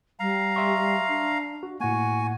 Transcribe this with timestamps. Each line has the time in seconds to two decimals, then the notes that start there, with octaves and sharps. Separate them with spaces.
0.19 G3 F5 A#5
0.56 E5 C6 C#6
1.07 D4
1.63 F#4
1.80 A2 A#3 F#4 F#5 G#5